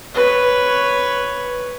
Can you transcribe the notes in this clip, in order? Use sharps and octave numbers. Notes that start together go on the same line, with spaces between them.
B4 C#5